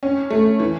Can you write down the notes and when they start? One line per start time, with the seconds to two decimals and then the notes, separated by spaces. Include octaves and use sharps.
0.03 C#4
0.30 A3
0.60 E3